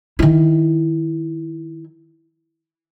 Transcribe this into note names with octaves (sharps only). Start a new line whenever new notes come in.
D#3 E4